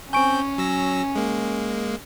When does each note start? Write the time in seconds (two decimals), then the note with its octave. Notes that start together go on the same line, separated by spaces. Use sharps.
0.13 C4 C#4 G#5 C#6 G6 D7
0.58 F#3 E6 A#6
1.16 G#3 A#3